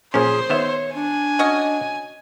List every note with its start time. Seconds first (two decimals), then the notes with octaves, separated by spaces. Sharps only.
0.14 A#2 F3 C#4 G#4 C5
0.50 D#3 B3 C#5 E5
0.95 D4 G#5
1.39 C#4 F#4 D#5